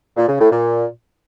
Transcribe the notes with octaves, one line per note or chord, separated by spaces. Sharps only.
A#2
C#3
A2
A#2